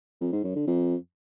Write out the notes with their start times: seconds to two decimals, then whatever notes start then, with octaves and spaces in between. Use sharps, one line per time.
0.21 F2
0.32 G#2
0.44 F#2
0.55 D3
0.67 F2